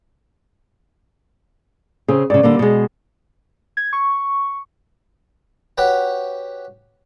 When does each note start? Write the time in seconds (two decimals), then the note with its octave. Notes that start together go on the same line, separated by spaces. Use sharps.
2.08 C#3 C4 G#4
2.30 G#2 C#3 D5
2.43 D3 G3 A#3
2.59 B2 G#3
3.77 G#6
3.93 C#6
5.78 F#4 G4 B4 C#5 F#5 G5